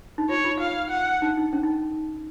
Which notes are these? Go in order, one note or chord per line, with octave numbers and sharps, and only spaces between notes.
D#4
F4 C#5
F4
F5
F#5
D#4
D#4
C#4
D#4